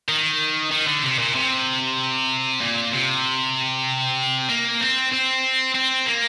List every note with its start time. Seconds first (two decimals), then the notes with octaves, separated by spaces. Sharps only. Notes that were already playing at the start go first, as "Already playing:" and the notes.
0.09 D#3
0.71 D#3
0.87 D3
1.03 C3
1.19 A#2
1.35 C3
2.60 A#2
2.92 C3
4.49 A#3
4.80 C4
5.12 C4
5.75 C4
6.06 A#3